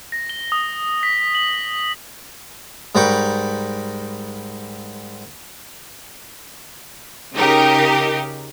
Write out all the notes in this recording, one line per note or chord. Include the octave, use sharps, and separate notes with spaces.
A#6
G7
D#6
B6
F#7
G#2 G3 A#4 B4 G5 C#6
C#3 D#4 G4 A#4